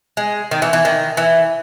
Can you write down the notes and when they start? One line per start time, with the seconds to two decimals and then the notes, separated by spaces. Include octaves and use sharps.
0.17 G#3
0.51 D#3
0.62 E3
0.73 E3
0.85 D#3
1.17 E3